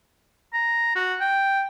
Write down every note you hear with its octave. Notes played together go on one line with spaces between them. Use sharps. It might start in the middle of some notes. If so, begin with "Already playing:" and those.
A#5
F#4
G5